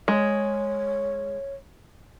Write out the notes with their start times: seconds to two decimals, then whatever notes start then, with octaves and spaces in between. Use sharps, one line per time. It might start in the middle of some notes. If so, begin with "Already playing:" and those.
0.08 G#3 C#5